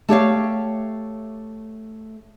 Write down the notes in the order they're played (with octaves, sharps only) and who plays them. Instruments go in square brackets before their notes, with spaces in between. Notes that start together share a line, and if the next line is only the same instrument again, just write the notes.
[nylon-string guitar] A3 G4 C#5 F5